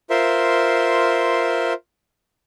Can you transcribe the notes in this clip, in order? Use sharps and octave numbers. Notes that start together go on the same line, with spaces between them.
F4 A#4 C5 E5 C6